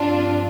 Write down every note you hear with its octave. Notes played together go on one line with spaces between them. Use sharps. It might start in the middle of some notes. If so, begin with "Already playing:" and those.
Already playing: G2 F3 C4 D4 F4